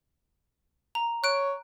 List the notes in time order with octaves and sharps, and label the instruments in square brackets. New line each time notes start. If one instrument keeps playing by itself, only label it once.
[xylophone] A#5
[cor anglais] C#5 [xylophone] F#6 D7